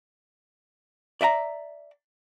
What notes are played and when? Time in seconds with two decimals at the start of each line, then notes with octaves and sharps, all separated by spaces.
1.21 D5 E5 G5 A#5